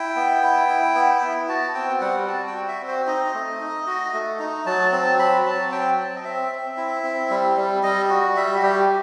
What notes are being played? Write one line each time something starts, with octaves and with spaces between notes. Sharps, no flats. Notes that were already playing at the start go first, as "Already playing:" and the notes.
Already playing: E4 G5
B3
E4
E4
B3
B3
F#4 A5
C4 G5
G3 F#5
F#4 A5
G5
F#4
E5
C4
C5
D#4 D#5
A3
D#4
F#4
A3
D#4
F#3 A5
C4 A5
F#3 B5
F#3 A5
C4 G5
C4 A5
D#5
C4 E5
C4
E4
C4
G3
G3
G3 D#5
F#4
G3 E5
F#4
G3 G4